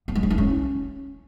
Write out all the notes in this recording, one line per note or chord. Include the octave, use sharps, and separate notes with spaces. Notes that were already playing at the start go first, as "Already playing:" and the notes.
B3
G#3
C#4
E4
C#4